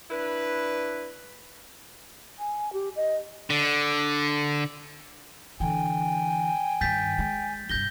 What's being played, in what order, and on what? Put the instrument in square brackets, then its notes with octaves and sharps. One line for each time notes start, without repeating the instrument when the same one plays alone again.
[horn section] D4 E4 B4
[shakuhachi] G#5
G4
D#5
[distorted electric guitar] D3
[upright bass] D3 E3 [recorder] G5 [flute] G#5
[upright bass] G2 D#3 [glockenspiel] G6 A6 B6
[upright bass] G#3
[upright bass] G2 C3 [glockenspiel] G6 A#6 G7